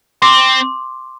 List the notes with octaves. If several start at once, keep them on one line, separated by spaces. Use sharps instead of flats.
C4 C6 D6